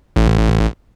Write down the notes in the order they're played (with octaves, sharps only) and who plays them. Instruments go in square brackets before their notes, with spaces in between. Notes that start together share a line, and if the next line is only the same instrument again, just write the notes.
[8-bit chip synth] A1